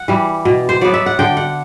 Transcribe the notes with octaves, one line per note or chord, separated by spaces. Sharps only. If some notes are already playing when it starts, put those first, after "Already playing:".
Already playing: F#5
E3 G3
B2
C5
F#3 B3 D5
E5
F#5
D3 G5
F#5